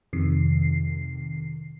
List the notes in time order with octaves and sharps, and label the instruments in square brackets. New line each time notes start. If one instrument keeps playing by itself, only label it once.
[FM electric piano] F2 C3 D#3 C7